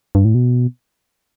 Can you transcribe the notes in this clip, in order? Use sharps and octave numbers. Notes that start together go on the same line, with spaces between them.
G2
A2
B2